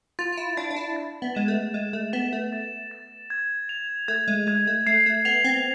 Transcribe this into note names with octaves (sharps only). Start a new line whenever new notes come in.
F4 A6
F4
E4
D4 A6
D4
E4
A6
B3
G#3 E7
A3
G#3 A6
A3
B3 E7
A3
A6
A6
G#6
F7
A3 G#6
G#3
G#3 G#6
A3
A3 C7
A3
B3 F7
C4